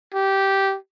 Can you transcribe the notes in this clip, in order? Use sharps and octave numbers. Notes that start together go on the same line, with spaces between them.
G4